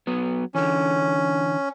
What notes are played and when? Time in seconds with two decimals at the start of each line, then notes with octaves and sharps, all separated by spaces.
0.07 F#3 B3
0.55 D3 E3 C#4